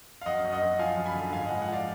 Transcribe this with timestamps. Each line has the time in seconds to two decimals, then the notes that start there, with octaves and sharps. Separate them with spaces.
0.22 F5
0.26 F#2 D#5 F#5
0.44 F#2
0.53 D#5 F#5
0.62 F#2
0.79 F3 F5 G#5
0.97 F#2
1.06 G#5 B5
1.15 D3
1.33 G#2 F5 G#5
1.46 D#5 F#5
1.51 F3
1.62 F#5
1.68 F3 D5 F5